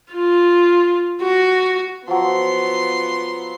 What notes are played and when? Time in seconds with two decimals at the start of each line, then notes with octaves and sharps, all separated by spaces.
0.13 F4
1.22 F#4
2.08 F3 F#3 B3 C6